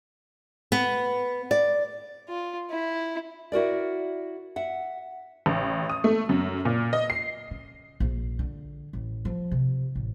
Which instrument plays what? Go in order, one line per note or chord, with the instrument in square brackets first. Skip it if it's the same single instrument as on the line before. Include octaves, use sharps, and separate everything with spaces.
[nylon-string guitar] B3
D5
[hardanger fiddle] F4
E4
[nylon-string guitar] E4 F#4 A#4 D5
E5 F#5
[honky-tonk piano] A1
D#6
A3
F#2
A#2
D#5
C7
[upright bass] C#3
A#1
D3
A1
F3
C3
A1